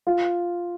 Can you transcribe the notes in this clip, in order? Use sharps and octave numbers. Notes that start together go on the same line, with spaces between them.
F4